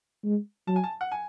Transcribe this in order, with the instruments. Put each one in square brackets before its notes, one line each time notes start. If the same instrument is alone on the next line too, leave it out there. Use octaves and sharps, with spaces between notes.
[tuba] G#3
[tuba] F#3 [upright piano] A5
[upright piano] G#5
A5
F#5
G#5